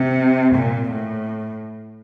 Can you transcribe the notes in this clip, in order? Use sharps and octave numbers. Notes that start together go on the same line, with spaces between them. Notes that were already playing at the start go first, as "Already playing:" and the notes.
Already playing: C3
A#2
A2